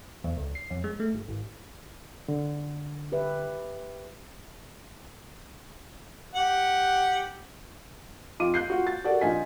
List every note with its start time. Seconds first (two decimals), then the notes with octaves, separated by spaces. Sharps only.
0.24 E2
0.37 C#2
0.55 C7
0.70 F2
0.84 G#3
1.00 A3
1.15 G1
1.28 G#1
2.28 D3
3.12 G4 B4 E5
6.35 G4 F#5
8.40 F2 D#4 F4 D6 D#7
8.54 F#6 G6 C7
8.70 F4 F#4
8.87 A6
9.04 F#4 G4 A4 A#4 D5 F#5
9.21 A#1 D#4 F4 G#5 B6